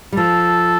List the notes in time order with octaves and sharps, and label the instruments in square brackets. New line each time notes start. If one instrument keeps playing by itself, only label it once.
[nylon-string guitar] G3
[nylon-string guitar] F3 [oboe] A4